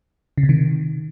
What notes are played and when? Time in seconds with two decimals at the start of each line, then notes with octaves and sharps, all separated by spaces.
0.38 C#3
0.43 C3
0.49 D#3